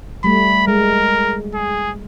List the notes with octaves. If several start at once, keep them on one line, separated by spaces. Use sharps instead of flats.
G3 A3 B5
G#3 A#4
G#4